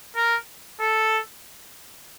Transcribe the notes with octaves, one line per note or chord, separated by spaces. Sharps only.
A#4
A4